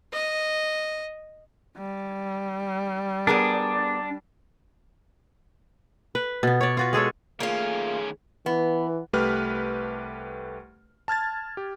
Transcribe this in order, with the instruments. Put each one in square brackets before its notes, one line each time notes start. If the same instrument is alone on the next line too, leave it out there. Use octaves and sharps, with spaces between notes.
[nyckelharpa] D#5
[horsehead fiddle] G3
[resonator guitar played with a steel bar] B3 G#4 A#4 [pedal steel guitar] D4
[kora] B4
B2 B3
C#5 D5
F4 F#4 B4
G#3 G#4 A4 C#5
[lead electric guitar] D#3 C#4 [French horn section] A3 G#4 [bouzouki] A#3 F4
[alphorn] E3 [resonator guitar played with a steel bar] B3
[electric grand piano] C2 A3 G4 B4 B5 F6
A5 F6 G#6 A6
G4